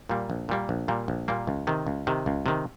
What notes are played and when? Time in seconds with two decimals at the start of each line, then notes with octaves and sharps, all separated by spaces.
0.09 A#2 G3 A#3
0.30 A#1
0.49 A#2 G3 A#3
0.69 A#1
0.88 A#2 G3 A#3
1.08 A#1
1.28 A#2 G3 A#3
1.47 C#2
1.67 C3 D#3
1.87 C#2
2.07 C3 D#3
2.26 C#2
2.46 C3 D#3